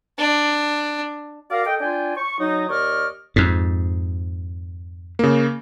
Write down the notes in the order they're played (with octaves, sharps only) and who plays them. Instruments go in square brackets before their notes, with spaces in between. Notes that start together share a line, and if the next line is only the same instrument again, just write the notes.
[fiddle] D4
[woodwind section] F#4 A#4 D5 F5
A4 D#5 G5
D4 F4 G5 G#5
C#6
F#3 D#4
D#2 D5 D#5 C#6 F6
[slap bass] F2 G#2
[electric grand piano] C#3 A#3